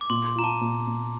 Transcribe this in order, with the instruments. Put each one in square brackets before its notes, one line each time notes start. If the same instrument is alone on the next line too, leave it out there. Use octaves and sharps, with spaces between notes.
[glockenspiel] D6
[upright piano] A#2 [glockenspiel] C6
[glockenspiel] C6
[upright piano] F4 [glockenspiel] A#5
[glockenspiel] A5
[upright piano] A#2
A#2